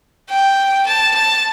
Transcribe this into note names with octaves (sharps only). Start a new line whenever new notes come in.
G5
A5
A5